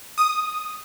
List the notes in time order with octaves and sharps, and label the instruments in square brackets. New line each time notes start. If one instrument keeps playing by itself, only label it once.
[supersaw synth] D#6